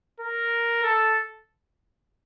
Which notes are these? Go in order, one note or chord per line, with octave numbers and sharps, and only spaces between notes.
A#4
A4